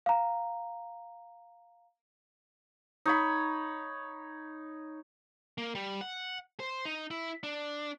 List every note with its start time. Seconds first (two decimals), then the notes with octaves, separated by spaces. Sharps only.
0.06 F5 A#5
3.06 D#4 C#5 B5
5.58 A#3
5.75 G3
6.01 F#5
6.60 C5
6.86 D#4
7.11 E4
7.43 D4